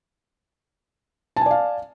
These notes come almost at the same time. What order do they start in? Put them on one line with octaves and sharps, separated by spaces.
A5 G#5 D5 F5